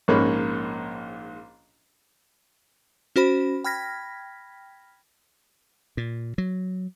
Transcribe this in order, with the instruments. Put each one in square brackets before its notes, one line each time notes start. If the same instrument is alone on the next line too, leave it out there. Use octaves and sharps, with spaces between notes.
[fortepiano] A#1 G#2 A#3 C#4 B5
[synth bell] C#4 F#4 C5 B5
G5 B5 F6 G#6 A#6 B6
[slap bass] A#2
F#3